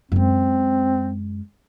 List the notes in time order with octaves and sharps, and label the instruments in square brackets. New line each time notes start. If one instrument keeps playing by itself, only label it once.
[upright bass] F#2 G#3 [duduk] C4